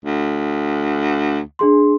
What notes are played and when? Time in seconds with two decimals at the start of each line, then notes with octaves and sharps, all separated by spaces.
0.05 D2
1.59 D4 G#4 C6